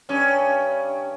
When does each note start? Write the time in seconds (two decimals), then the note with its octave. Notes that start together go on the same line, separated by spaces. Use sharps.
0.09 G2 C#4